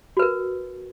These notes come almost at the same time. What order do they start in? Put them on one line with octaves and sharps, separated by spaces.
F#4 B4 A#4